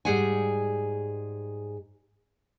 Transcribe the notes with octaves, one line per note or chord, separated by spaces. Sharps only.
G#2 F#3 G3 G#4 F#5 G#5